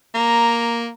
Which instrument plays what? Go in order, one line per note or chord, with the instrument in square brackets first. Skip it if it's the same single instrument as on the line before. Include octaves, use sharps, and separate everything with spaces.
[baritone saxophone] A#3 [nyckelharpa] A#5